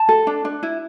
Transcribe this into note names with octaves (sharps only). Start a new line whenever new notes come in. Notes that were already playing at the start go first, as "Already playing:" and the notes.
Already playing: A5
A4
D4
D4
E4